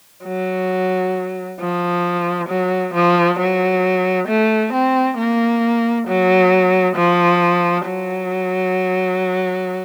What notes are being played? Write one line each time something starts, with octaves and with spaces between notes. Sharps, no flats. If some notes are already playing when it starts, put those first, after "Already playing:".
F#3
F3
F#3
F3
F#3
A3
C4
A#3
F#3
F3
F#3